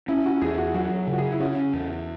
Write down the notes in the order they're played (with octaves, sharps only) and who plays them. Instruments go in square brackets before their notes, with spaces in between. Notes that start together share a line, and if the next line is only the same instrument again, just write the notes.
[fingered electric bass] C#4 [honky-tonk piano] E4
[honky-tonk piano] F#4
[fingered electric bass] E2 [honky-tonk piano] G#4
[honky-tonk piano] F#4
[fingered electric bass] F#3 [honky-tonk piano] F#4
[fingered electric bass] C#3
[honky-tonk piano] F#4
G#4
E4
[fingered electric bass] C#4 [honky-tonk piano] F#4
[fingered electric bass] E2